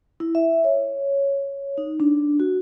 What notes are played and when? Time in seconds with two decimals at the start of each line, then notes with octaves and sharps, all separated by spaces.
0.20 E4
0.35 E5
0.64 C#5
1.78 D#4
2.00 D4
2.40 F#4